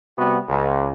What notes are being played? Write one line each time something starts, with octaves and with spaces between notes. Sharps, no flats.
C3 G3 B3 F#4
C#2